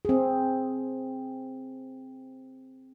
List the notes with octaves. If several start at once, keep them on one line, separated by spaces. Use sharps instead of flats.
C4 G#4